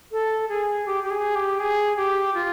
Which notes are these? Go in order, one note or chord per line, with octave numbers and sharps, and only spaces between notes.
A4
G#4
G4
G4
G#4
G4
G#4
G4
F4